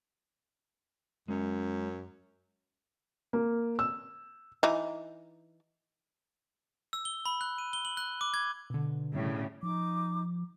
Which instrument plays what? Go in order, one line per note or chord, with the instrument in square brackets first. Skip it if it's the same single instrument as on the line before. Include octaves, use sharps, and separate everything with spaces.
[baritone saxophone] F#2 [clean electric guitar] G#3 C#4 C#5
[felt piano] A#3
E6
[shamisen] E3 D#4
[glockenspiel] E6
G7
B5
F#6
D#7
G7
F#7
F#6
D6
G#6
[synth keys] B2 D3
[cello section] A2 C#3 G3
[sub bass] F3 [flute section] D#4 D6